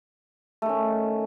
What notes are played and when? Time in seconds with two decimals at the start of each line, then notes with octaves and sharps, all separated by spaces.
0.62 A3
0.66 D#3
0.69 C#4